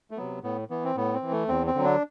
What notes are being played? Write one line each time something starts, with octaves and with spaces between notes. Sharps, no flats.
A3
C3 F#3 B3
A2 B3
E3 B3
C4
A2 B3
C4
E3
A3
E2 C4
C4
D3 F#3
D4